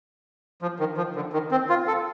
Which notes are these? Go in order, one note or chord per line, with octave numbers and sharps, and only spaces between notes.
F3
D#3
F3
D3
D#3
C4
F4
A4